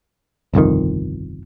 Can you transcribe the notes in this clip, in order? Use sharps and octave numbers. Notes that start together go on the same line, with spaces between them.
G1 C2 F2 D#3